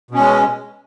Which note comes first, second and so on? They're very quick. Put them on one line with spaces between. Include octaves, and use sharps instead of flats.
B2 C#4 G#3